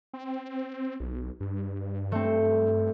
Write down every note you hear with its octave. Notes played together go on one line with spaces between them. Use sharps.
C4
B1
G2
A3 C4